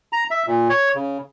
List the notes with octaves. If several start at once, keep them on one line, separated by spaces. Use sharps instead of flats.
A#5
E5
A#2
C#5
C#3